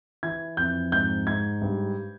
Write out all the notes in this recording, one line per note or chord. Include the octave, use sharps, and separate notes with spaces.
E3 G#6
F2 G6
G#2 G6
G#2 G#6
G2